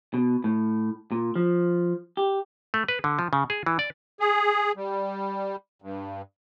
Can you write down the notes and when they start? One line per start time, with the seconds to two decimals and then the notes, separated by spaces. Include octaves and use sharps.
0.14 B2
0.44 A2
1.12 A#2
1.36 F3
2.17 G4
2.74 A3
2.88 B4
3.04 D3
3.19 F3
3.33 C#3
3.50 G#4
3.66 E3
3.79 D5
4.20 G#4
4.76 G3
5.82 G2